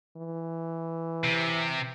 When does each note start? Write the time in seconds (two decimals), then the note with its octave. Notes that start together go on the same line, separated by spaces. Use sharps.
0.17 E3
1.24 C3